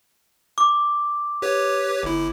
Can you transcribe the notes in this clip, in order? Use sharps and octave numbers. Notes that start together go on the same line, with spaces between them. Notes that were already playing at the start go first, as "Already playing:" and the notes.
D6
G4 B4 C#5
G1 E4